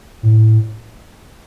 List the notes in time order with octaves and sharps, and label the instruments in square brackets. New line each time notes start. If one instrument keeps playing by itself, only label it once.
[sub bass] A2